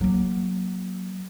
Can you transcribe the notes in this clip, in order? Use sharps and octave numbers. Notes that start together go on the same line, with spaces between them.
F#3 A#3